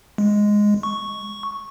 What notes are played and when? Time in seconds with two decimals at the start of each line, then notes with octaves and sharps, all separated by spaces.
0.18 G#3
0.83 C#6